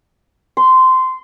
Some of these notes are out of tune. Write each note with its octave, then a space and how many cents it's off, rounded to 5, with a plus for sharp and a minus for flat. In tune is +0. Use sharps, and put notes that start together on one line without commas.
C6 -15